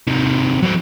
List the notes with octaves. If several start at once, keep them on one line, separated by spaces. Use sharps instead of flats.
C3 D#3
F#3 C4